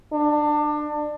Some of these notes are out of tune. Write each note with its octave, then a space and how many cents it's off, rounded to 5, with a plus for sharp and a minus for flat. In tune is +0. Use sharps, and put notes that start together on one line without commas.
D4 +25